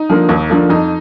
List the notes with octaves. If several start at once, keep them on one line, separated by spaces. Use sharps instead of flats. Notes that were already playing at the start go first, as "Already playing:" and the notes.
Already playing: D#4
D3 F3 A#3
D#2
D3 F3 A#3
F2 D#4